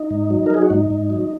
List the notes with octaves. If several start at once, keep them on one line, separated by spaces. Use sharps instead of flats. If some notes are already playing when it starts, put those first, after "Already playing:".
Already playing: D#4
G#2
F#3
A#4
F#3 G#4
F#4
G#2 D#4
G#2
F#3